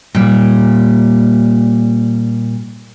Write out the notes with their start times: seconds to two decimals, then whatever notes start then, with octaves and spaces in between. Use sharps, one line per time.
0.15 A#2 G3